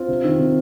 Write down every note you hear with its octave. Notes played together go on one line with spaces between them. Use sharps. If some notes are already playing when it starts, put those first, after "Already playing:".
Already playing: C4 F4
C3
D#3
C3